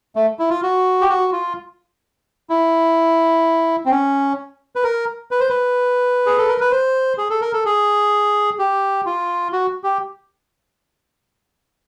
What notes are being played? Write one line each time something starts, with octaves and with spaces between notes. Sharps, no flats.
A3
E4
F4
F#4
G4
F#4
F4
E4
C4
C#4
B4
A#4
B4
C5
B4
G#4
A4
A#4
B4
C5
G#4
A4
A#4
A4
G#4
G4
F4
F#4
G4